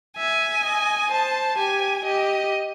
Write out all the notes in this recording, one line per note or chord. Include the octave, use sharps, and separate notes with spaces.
E5 G#5
D#5
C5 A5
G4 G#5
G4 D#5